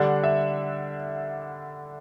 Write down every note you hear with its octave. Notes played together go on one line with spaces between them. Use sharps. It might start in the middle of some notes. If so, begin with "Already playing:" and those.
Already playing: D3 G3 D4 F#5
E5